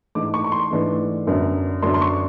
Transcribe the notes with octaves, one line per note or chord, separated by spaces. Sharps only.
G#2 E3 A3 D4 D6
C#6
C#6
C6
G#2 E3 A3 D4
F#2 D3 F#3 B3 D4
F#2 D3 F#3 B3 D4 C6
C6
C#6